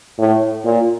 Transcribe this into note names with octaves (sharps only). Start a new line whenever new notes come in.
A2
A#2